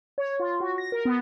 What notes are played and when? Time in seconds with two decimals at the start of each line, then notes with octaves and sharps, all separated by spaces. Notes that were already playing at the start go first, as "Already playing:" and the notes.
0.18 C#5
0.40 F4
0.60 F#4
0.78 A#6
0.92 A#4
1.05 B3